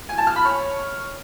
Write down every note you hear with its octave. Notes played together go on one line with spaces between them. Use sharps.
G#5
A5
F6
B5
C#5